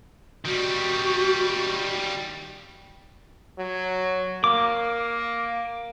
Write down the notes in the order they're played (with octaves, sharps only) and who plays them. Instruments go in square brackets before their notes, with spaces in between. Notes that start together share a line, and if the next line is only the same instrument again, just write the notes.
[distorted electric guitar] D#3 G3 [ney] F#4
[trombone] F#3
[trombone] A#3 [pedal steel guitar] D6